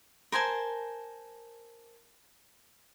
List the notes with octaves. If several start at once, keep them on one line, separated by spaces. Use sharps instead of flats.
A#4 C5 G#5 A5